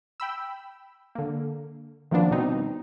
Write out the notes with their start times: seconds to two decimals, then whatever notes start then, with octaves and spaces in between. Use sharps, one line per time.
0.20 G5 B5 E6
1.15 D3 A#3
2.11 D#3 F3 A#3 B3 D4
2.31 B2 G3 C4 D#4